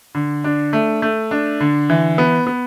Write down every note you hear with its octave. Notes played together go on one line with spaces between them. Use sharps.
D3
D4
A3
A3
D4
D3
E3
B3
B3